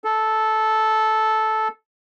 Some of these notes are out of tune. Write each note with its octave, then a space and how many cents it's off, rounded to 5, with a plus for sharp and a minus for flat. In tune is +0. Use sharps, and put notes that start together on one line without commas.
A4 -10